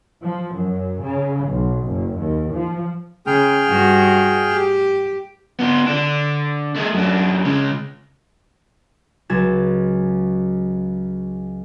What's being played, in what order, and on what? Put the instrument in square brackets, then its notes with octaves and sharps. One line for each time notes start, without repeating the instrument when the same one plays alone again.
[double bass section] F3
F#2
C#3
B1
F#1
D#2
F3
[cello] C#3 [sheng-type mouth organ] G#4 G5 F6
[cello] G2 F#4
G4
[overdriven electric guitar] B3 F4
D3 D4
A3 G#4
F#2 D4
C#3 G#3
[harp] C#2 F#3 F#4 G#6 A6 E7